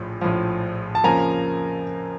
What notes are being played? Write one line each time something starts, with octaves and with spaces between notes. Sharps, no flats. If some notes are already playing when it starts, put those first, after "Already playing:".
Already playing: A#1 A2 F3
A#1 A2 F3
A5
F2 C#3 F3 A#3 G#5 A#5